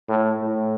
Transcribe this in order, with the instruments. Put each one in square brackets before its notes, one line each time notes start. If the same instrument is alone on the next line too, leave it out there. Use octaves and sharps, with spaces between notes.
[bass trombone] A2
A2